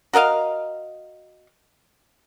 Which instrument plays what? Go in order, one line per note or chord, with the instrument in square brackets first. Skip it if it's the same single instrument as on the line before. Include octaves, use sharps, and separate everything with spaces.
[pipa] F#4 A#4 D#5 F5